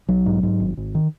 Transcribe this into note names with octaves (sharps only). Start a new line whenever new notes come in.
B1 F#3
G#2
G#2
G#1
G#1
D#3